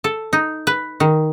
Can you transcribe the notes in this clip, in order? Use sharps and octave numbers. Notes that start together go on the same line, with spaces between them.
A4
D#4
B4
D#3